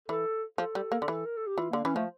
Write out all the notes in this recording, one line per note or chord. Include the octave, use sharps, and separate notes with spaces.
E3 A4
F3 A4
G3
A#3
D3
E3
A#4
A4
G4
E3 F4
D3 A#3
E3 C#4
F3 A3